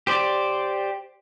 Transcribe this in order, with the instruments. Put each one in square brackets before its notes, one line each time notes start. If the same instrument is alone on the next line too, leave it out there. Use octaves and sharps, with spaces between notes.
[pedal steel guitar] G4 C5 D5